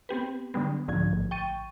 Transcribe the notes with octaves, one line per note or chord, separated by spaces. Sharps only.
B3 C4 G4 B4
D3 F#3 G3 B3
C2 G#2 D3 F3 G#6
A1
G5 C#6 A6 D#7